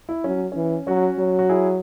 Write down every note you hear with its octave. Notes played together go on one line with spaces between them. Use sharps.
E4
F#3 C#4
E3 C#4
F#3 C#4 F#4
F#3
F#4
E4 G#4